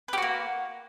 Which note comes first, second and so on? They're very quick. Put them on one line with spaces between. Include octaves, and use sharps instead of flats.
B4 G4 F#4 A#3